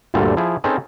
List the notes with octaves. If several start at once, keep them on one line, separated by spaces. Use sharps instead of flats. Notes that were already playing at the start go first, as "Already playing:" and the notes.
D2 G2 A#2 D3 G3 A4
F3 E4 G#4
C4 C#4 D#4 G#4 A4 B4